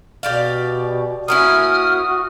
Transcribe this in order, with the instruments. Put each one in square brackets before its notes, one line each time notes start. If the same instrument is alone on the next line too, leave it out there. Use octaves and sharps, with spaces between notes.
[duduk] B2 [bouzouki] G4 D5 F5
[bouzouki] A#3 C#4 E4 [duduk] F#4 [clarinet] D#6 [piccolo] F6